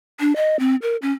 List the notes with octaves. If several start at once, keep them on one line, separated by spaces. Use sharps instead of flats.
D4
D#5
C4
A#4
C#4